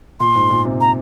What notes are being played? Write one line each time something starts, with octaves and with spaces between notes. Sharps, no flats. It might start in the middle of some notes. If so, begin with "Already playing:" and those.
A#2 C6
G#2
A#2
C3
A#5